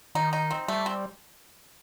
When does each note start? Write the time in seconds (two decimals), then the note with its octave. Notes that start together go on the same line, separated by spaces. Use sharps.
0.15 D#3 D#4
0.33 D#4
0.51 C4
0.68 G3 A3
0.86 C4